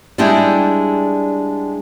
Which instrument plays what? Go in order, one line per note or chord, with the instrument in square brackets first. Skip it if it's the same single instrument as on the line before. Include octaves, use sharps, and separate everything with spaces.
[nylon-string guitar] G3 G#3 D4 E4 G4 G5